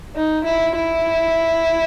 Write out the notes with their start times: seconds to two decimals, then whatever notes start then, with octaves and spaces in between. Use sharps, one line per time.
0.15 D#4
0.45 E4
0.75 E4